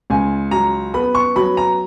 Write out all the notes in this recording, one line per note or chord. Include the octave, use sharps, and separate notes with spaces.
C#2 G#5
F#3 A#5
B3 B5
C#6
F#3 B5
A#5